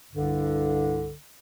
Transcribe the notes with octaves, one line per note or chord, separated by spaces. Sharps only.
C2 G2 D3